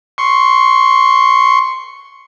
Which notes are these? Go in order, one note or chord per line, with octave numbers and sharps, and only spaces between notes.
C6 C#6